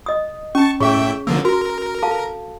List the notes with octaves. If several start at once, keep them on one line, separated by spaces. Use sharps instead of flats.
D#5 D#6
C#4 A5 C#6
A2 G#4 C#5 E5 G5 C#6
D3 F3 A#3 E6
F#4 A#4
A4 F5 A5